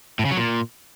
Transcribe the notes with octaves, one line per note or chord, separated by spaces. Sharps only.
A2
C#3
F#3
A#2